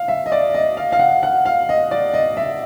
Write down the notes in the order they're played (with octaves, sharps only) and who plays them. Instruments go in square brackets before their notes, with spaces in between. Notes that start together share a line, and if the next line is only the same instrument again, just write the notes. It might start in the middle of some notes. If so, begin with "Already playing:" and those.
Already playing: [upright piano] F5
E5
D#5
D5
D#5
F5
F5
F#5
F#5
F5
D#5
D5
D#5
E5